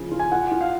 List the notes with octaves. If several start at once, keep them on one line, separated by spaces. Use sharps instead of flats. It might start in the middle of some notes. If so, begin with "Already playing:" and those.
Already playing: C#3 F3
F4
G#5
F4 F#5
F4
F5